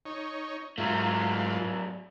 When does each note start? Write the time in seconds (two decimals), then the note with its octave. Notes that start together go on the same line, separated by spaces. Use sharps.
0.06 D#4 C#5
0.78 G#2 F#3 A3 F4